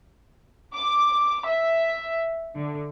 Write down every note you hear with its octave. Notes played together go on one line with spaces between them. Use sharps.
D6
E5
D3